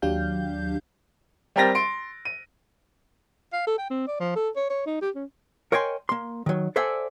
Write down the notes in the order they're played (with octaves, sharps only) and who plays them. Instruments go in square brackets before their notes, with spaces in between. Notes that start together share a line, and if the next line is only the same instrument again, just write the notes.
[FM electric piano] D#2 F#3 D4 G4 F5 G6
[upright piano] G3 C4 G4 A#4 A6 A#6
C6 D7
D#7
[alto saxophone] F5
A4
G5
C4
D5
F3
A4
C#5
C#5
D#4
G4
C#4
[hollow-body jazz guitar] A#4 C#5 D#5 G5 G#5 C6
A#3 C6
D#3 F#3
A4 C5 D5 E5 F#5 G#5